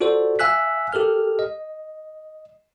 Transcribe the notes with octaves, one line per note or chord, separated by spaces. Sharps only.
F4 F#4 A4 C5 D5
E5 F5 G#5 E6 F#6 B6
G4 A4 A#4 F6
D#5